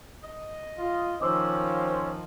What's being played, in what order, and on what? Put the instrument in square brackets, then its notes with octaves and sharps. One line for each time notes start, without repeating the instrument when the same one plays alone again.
[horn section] D#5
[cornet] F4
[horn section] D#3 F3 [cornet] C#4 [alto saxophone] C5 [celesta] D6 E6